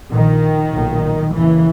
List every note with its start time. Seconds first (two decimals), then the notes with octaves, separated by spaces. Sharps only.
0.10 A#1 A#2 D#3
0.72 B1 A#2
1.33 D#2 C#3 E3